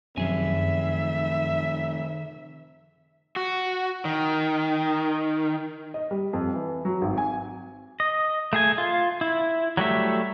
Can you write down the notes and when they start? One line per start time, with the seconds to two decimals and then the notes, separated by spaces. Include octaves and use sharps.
0.18 F#2 C3 D#3 F3 C4 G#4 E5 G#5
3.36 F#4
4.05 D#3
5.94 D#5
6.11 G3
6.33 F2
6.54 E3
6.85 F#3
7.02 G#1
7.18 G#5
8.00 D#5
8.53 A3 G#4 G#5
8.78 F4
9.21 E4
9.77 F#3 G3 A3 E5